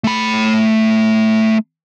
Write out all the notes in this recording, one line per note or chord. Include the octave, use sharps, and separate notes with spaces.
A3 B5